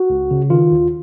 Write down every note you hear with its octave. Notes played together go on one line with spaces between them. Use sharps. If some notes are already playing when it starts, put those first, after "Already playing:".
Already playing: F#4
C#2
C#3
D#3 F4
D#2